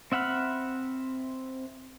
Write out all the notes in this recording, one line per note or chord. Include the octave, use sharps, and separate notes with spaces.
C4 E5 F#5 B5 F6